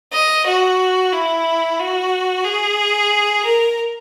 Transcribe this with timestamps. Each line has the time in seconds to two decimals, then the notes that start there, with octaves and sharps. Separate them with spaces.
0.13 D#5
0.46 F#4
1.13 E4
1.79 F#4
2.44 G#4
3.44 A#4